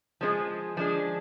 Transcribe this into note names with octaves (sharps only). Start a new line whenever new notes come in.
F3 G#3 D4 G#4
F3 G#3 D4 G#4